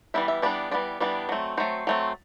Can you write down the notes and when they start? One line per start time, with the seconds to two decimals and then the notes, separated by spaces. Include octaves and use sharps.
0.14 E3 G3 B3 D4 E5
0.28 E5
0.42 E3 G3 B3 D4 D5
0.71 E3 G3 B3 D4 D5
1.00 E3 G3 B3 D4 D5
1.29 F#3 A3 C4
1.57 F#3 A3 C4 C5
1.87 F#3 A3 C4